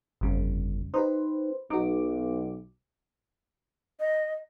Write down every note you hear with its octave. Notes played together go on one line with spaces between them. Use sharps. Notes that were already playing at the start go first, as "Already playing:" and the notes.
G1 F2 C#3 G3
D#4 G4 B4 C5
B1 D#4 F#4 D6
D#5